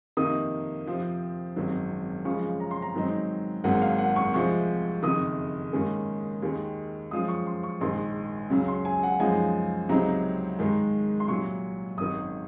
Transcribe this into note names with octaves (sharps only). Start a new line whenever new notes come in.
F2 C3 D#3 A#3 D#4 D#6
F2 C3 F3 C4
G#1 F#2 D#3 F#3 C4
F#2 C#3 F3 G#3 C#4 C#6
A#5
C6
A#5
G#2 D#3 F#3 C4 D#4
G#1 G#2 F#3 A#3 F#5
F5
F#5
C#6
C2 C3 F3 G#3 C4 C#6
F#1 F2 D#3 D#6
G#2 D#3 A#3 C#4
D#2 D#3 G#3
F#2 F3 G#3 D#6
C#6
C6
C#6
A#1 G#2 D#3 C6
C#2 C#3 F#3 C#4
C6
G#5
F#5
F#2 C#3 F3 G#3 D#4 G#5
C#2 C3 F#3 C4 D#4 A#5
G#2 D#3 G#3
C6
C2 A#2 F#3 C#6
G#1 F#2 D#3 D#6